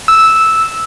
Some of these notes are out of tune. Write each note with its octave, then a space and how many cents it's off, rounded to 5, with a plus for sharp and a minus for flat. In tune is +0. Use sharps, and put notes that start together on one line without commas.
E6 -5